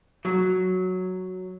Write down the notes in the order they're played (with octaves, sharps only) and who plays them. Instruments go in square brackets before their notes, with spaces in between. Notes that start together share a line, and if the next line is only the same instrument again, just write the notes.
[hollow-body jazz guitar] F#3